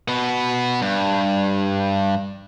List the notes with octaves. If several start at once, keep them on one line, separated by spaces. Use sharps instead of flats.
B2 B3
G2